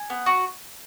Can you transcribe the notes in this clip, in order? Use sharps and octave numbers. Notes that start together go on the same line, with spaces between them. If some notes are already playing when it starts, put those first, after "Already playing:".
Already playing: G#5
B3
F#4